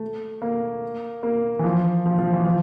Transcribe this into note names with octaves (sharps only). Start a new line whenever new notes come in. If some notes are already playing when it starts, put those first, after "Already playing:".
Already playing: A3
A#3
A#3
E3
F3
F3
F3
E3
F3